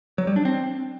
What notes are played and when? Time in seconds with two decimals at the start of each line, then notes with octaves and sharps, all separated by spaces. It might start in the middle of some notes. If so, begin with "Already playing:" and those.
0.18 F#3
0.27 G3
0.36 D4
0.45 C4